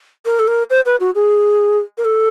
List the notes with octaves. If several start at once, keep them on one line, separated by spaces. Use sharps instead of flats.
A#4
A4
A#4
C5
B4
F#4
G#4
A#4
A4